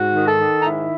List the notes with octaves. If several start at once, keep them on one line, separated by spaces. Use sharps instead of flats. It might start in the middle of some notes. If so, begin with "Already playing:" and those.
Already playing: G#2 F#4
D#3
A4
D#3
D#4
G#2 E4